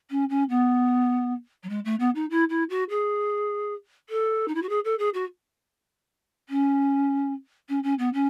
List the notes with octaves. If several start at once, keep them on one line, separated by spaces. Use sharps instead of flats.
C#4
C#4
B3
F#3
G#3
A3
B3
D#4
E4
E4
F#4
G#4
A4
D#4
E4
F#4
G#4
A4
G#4
F#4
C#4
C#4
C#4
B3
C#4